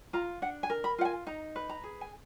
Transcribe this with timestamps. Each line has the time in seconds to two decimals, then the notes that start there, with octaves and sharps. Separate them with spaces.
0.13 F4 A#5
0.42 D4 F#5
0.63 G#5
0.70 A#4
0.84 B5
0.98 F4 F#5
1.05 G#5
1.27 D#4 A#5
1.56 B4
1.69 A#5
1.84 G#4
2.01 G#5